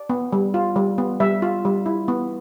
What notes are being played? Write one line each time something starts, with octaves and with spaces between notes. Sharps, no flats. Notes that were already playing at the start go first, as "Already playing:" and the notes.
Already playing: D5
B3
G3
F4
G3
B3
G3 E5
F4
G3
E4
B3